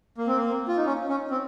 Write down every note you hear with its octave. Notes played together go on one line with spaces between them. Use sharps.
A#3
C4
A#3
F4
D#4
C#4
C#4
C4